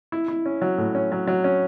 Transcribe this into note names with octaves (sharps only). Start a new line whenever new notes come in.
E4
E4
C#4
F#3
A2
C#4
F#3
F#3
C#4